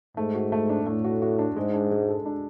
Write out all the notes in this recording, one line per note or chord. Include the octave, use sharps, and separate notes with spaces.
G#2 A3
F#4
A3
D4
A2 A3
F#4
F#4
D4
G#2 G#3
D4
G#3
A4
D4